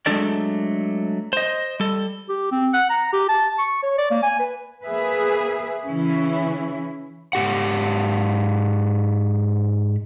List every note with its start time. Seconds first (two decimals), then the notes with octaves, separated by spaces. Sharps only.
0.06 F#3 G#3 A3 D4 A4 D5
1.33 C5 D#5
1.80 G3 A4
2.29 G4
2.51 C4
2.74 F#5
2.90 A#5
3.13 G4
3.29 A5
3.58 C#6
3.83 C#5
3.98 D5
4.11 A#3
4.23 G#5
4.39 B4
4.84 A#3 G#4 B4 E5
5.85 C#3 E3 C#4 E4
7.33 G#2 G4 F#5